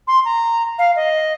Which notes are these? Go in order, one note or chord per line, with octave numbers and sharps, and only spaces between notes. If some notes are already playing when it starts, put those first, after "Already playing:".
C6
A#5
F5
D#5